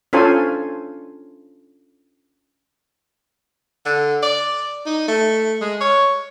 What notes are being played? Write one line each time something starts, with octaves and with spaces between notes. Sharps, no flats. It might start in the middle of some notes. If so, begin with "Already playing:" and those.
C#4 D4 F4 A4 C5 G#5
D3
D5
D#4
A3
G#3
C#5